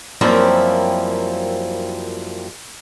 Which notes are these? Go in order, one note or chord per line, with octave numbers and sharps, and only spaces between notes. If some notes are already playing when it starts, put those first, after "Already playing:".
F#2 F3 G3 A#3 C4 E4